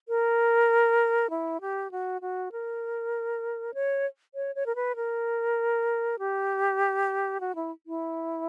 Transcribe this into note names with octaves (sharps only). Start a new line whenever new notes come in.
A#4
E4
G4
F#4
F#4
A#4
C#5
C#5
C#5
A#4
B4
A#4
G4
F#4
E4
E4